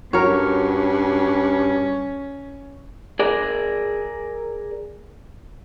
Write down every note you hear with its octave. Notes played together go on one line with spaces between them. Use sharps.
G2 C#4 F#4 A#4 C#5
G#4 A#4 D5